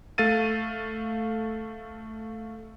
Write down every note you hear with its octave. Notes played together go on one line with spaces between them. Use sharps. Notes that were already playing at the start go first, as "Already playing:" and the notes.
A3 A4 F5 A6 D#7